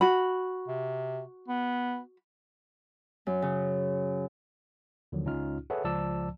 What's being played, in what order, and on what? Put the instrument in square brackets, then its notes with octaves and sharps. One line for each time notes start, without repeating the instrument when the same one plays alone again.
[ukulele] F#4 B5
[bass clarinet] C3
B3
[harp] F#2
C#3
[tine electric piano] D#2 D3 D#3 F3 F#3
C#2 C#4 D#4 F4 F6
G#4 A4 B4 C#5 E5 F#5
C#2 F3 D5 A5 E6